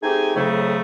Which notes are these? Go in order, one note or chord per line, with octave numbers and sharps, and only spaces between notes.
A3 C4 D#4 G4 G#4 G#5
F2 A2 C#3 F#3 A3